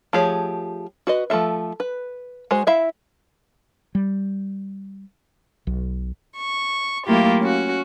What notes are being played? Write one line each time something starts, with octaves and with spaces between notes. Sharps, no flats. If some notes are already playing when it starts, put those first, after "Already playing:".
F3 A3 G4 G#4 C#5
F#4 B4 D#5
F3 A3 A4 E5
B4
G#3 F#4 C5
E4 E5 F5
G3
B1
C#6
F#3 A3 A#3 E4 F4 G4
C#4 F#4